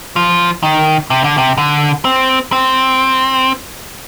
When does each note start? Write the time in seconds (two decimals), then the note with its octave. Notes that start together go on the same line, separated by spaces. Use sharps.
0.16 F3
0.63 D#3
1.10 C3
1.24 D3
1.38 C3
1.58 D3
2.05 C4
2.52 C4